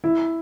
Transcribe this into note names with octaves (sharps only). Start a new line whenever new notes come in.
E4